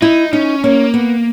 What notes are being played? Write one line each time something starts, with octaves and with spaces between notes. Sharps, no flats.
D#4 E4
C#4 D#4
A#3 C#4
B3